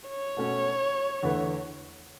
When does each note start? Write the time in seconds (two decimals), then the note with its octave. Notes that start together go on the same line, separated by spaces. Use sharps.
0.09 C#5
0.37 B2 A3 C#4 F#4
1.23 E2 D3 A3 E4 B4